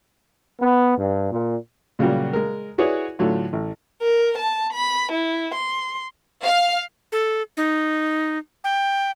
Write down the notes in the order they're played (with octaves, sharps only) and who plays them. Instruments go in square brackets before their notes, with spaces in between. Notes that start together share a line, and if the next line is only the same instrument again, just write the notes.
[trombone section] B3
G2
A#2
[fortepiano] A#2 C#3 F#3 G3 A#3 F#4
G#3 A#4
E4 F#4 G#4 B4 C#5 D5
A2 D3 F#3 A3 F4
A1
[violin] A#4
A5
B5
E4
C6
[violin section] F5
[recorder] A4
D#4
G5